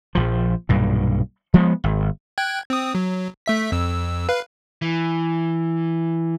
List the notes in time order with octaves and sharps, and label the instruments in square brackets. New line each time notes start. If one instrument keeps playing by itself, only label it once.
[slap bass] A#1 F3
B1 G2 A#2
F3 G#3 A3 B3
G#1
[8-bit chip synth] G5 F#6 G#6
C4 D#6
F#3
A3 E5 B6
F2 E6
B4 F5
[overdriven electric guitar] E3